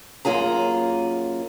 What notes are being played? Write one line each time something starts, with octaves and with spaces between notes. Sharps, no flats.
F#2 A#3 F4 G#4 A#5